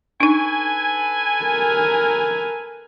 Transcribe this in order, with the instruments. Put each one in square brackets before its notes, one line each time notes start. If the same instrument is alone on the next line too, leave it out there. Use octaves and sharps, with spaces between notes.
[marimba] D4 D#4 [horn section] A4 B4 G#5
[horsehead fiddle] A#4